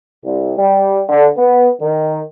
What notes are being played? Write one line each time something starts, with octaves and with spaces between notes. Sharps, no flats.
C2
G3
D3
B3
D#3